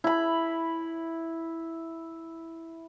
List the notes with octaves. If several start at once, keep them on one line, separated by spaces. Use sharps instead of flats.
E4 B5